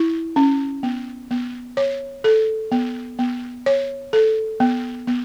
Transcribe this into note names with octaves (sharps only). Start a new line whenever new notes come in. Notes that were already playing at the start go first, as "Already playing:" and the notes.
Already playing: E4
C#4
B3
B3
C#5
A4
B3
B3
C#5
A4
B3
B3